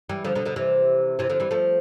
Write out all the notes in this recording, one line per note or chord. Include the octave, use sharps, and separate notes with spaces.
E3 G3
D3 F3
B2 D3
B2 D3
C3 E3
C3 E3
D3 F3
E3 G3
F3 A3